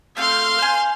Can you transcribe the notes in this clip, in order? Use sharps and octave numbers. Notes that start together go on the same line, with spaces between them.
A3 C4 F4 F5 C6 F6
C5 G#5